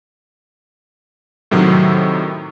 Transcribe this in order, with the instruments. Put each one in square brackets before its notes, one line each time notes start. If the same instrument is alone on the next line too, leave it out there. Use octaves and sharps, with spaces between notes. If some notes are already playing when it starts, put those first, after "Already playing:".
[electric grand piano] A2 C3 D#3 F#3